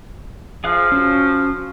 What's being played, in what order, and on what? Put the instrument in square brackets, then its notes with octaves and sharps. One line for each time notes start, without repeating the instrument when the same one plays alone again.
[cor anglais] F3 [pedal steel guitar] G#4 F5 F#6
[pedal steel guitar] C#4 F#4